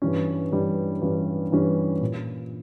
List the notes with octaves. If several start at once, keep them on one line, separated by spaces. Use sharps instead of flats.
G2 E3 G3 C#4
G2 E3 G3 C#4
G2 E3 G3 C#4
G2 E3 G3 C#4
A#2